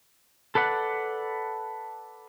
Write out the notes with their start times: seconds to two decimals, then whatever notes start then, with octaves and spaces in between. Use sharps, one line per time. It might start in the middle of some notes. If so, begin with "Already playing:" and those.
0.55 A4 B4 D5 F#5